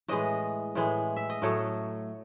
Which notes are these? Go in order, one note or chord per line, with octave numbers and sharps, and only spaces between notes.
A2 E3 G#3 D#5
A2 E3 G#3
E5
D#5
A2 F#3 A3 C#5